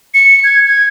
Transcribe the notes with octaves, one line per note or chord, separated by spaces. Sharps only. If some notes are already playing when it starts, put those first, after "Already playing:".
C#7
G#6
G#6